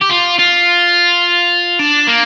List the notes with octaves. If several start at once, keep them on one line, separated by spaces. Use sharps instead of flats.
G4
F4
F4
D4
A#3